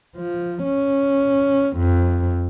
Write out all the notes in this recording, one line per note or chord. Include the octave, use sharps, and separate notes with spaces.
F3
C#4
F2